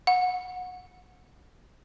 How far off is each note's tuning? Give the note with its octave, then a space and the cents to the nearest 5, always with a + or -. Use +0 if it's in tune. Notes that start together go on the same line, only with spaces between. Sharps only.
F#5 -25